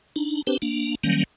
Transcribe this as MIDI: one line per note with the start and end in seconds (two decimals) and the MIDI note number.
0.16 0.42 62
0.16 0.42 63
0.47 0.57 60
0.47 0.57 62
0.47 0.57 67
0.47 0.57 71
0.47 0.57 72
0.62 0.95 58
0.62 0.95 62
1.04 1.24 51
1.04 1.24 54
1.04 1.24 55
1.04 1.24 58
1.04 1.24 61